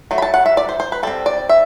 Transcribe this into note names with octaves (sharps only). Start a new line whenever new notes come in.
F#3 A3
B5
A5
F#5
E5
D5
C5
C5
B4
G3 C4 A4
D5
E5